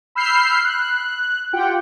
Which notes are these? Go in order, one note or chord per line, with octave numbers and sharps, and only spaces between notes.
B5 E6 F6 G6 C7
F#6
F4 G4 F#5 G5